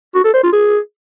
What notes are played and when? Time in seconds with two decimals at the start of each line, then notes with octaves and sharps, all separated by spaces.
0.15 F#4
0.24 A4
0.33 C5
0.43 F4
0.52 G#4